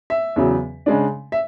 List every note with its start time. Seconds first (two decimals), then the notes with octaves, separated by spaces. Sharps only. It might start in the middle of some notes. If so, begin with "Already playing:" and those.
0.10 E5
0.36 E2 C#3 F#3
0.86 C#3 G#3 D4
1.32 E5